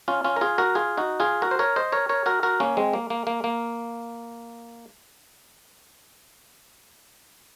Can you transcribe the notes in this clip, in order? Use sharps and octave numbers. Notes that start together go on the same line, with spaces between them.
C#4 F4
C#4 F4
A#4
F4 G#4
F#4 A#4
F4 G#4
D#4 F#4
F4 G#4
F#4 A#4
C5
A#4 C#5
C5 D#5
A#4 C#5
A#4 C#5
F#4 A#4
F#4 A#4
A#3 C#4
G#3 C4
A#3
A#3
A#3
A#3